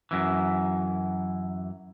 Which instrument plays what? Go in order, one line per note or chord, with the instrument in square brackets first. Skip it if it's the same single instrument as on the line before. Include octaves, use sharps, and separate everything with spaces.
[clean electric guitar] F#2 E3